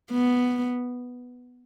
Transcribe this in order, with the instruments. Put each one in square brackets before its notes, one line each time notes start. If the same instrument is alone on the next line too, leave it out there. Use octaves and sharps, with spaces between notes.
[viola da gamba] B3